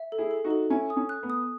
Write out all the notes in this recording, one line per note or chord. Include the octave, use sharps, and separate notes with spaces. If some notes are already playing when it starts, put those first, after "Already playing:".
Already playing: E5
A4
E4 G#4
A4
D#4 F#4
A4
C#4 E4 G#5
D#6
C#4
F#6
B3
D#6